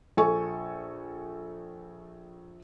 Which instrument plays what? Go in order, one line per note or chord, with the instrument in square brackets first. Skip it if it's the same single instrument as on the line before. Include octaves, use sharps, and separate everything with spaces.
[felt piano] A#1 A4 G#5 C#6